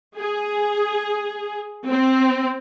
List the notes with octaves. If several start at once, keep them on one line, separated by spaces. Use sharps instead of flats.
G#4
C4